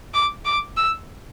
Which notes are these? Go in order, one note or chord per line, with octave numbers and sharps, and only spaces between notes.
D6
D6
E6